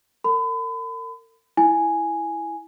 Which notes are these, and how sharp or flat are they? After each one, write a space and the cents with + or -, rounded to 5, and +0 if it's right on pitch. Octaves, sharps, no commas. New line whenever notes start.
A#4 -40 B5 +35
E4 +0 G#5 +0